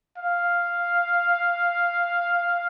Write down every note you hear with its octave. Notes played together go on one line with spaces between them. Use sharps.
F5